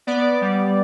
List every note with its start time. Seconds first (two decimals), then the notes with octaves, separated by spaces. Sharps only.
0.07 B3 D5
0.41 G3